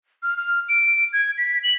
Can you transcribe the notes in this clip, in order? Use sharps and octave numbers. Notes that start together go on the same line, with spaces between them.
F6
F6
D7
G#6
B6
F#7